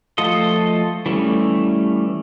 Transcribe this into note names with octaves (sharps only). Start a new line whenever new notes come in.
F3 A3 F4 A4 D#5
E3 G3 A3 C#4